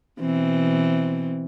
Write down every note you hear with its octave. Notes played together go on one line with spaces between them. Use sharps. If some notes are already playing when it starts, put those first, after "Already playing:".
B2 E3 C4